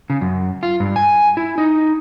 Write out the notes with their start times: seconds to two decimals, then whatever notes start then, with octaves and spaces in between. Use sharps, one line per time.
0.10 C#3
0.21 F#2
0.63 F4
0.80 G2
0.96 G#5
1.37 E4
1.58 D#4